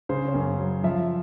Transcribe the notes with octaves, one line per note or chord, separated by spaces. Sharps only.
C#3 C5
C#5
F#2
F#3
F3 E5